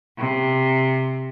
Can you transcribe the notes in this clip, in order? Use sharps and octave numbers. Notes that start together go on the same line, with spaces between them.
C3